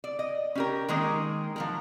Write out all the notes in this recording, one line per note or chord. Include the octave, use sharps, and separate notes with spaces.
D5
D#5
C#4 G4 A#4
D#3 G#3 A#3 D#4 G#4 A#4
F3 F#3 A#4